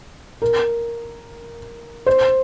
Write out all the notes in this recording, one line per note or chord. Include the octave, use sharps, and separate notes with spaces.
A#4
C5